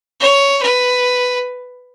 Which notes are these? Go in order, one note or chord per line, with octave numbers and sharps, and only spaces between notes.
C#5
B4